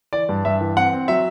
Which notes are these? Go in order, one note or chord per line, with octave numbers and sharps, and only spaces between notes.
E3 D5
G2
G2 E5
E3
C4 F#5
C4
F#3 E5